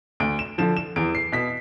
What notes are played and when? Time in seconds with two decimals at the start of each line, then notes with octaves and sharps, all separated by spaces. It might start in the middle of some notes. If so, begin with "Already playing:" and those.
0.20 D2 D7
0.39 E7
0.58 D3 F3 E7
0.77 E7
0.96 E2 D7
1.15 C7
1.32 B2 B6